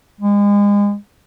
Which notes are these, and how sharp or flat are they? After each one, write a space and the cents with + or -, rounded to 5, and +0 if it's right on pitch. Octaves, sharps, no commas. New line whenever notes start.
G#3 -35